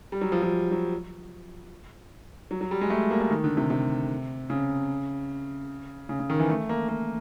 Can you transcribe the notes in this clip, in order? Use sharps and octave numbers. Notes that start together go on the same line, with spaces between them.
G3
F#3
F3
F3
F#3
F#3
F#3
G3
G#3
A3
A#3
A3
D#3
D3
C3
C3
C#3
C#3
C#3
D#3
E3
A3
A#3
A#3